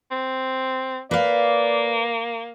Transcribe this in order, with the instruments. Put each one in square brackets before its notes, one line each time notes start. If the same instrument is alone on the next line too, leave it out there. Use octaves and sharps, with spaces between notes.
[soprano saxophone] C4
[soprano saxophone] A#3 [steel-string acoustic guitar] B4 F5 [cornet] D5